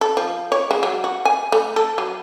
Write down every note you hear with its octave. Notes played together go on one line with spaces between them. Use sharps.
A4
F3
C#5
G#3
F#3
F#4
G#5
A3
A4
F#3